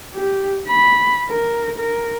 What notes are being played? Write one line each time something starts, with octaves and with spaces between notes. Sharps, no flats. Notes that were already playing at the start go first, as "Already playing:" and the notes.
G4
B5
A#4
A#4